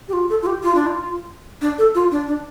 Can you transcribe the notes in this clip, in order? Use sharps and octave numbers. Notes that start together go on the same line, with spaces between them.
G4
F4
A4
F4
G4
F4
D4
F4
D4
A4
F4
D4
D4